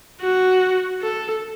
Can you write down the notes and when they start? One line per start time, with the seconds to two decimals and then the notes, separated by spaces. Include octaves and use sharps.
0.21 F#4
1.02 A4